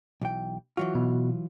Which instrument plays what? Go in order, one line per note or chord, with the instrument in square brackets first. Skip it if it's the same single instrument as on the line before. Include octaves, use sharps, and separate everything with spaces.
[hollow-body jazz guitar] B1 E3 G5
[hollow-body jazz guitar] E3 F#3 F4 [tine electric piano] F#4
[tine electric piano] B2